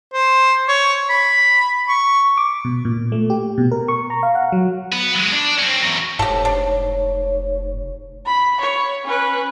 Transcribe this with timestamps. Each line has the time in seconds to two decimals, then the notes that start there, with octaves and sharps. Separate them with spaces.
0.13 C5
0.68 C#5
1.10 B5
1.89 C#6
2.37 D6
2.65 B2
2.85 A#2
3.12 A3
3.30 G4
3.58 B2
3.72 A#4
3.88 C#6
4.10 A#5
4.23 F5
4.35 F#5
4.52 F#3
4.92 B3 B4
5.15 F#3 G#3
5.32 D4
5.59 C4 C#4
5.82 E2 F#3
6.19 F1 G#2 G4 A4 C#5
6.45 D4
8.26 B5
8.60 C#5
9.05 C#4 B4